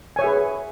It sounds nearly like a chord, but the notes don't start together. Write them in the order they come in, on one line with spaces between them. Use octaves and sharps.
G#5 C#5 E5 G#4 B4